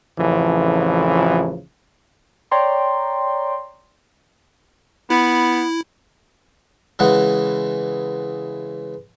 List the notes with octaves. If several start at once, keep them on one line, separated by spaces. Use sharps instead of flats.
A1 F2 C#3 E3 F3
C#5 D5 G5 A#5 C6
B3 E4
C#3 E3 G#3 F#5